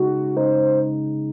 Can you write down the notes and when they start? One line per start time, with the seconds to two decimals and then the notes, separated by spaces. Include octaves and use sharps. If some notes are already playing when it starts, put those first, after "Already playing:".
Already playing: C#3 G#3 D#4 F#4
0.37 C#3 G#3 D#4 C5